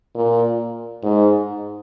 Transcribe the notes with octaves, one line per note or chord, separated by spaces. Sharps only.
A#2
G#2